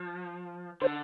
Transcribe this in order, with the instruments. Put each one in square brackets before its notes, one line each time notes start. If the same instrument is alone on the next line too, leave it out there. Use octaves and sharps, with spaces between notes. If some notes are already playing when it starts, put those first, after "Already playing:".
Already playing: [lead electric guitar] F3
[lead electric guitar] D3 [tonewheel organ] C5